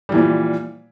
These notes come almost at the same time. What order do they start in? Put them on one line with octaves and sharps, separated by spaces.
G3 E3 A#2 F3